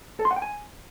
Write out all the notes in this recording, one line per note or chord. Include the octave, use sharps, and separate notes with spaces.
A4
C6
F#5
G5
G#5